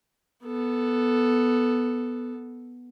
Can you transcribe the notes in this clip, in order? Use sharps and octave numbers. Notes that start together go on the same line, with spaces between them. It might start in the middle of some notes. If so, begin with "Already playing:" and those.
B3 A4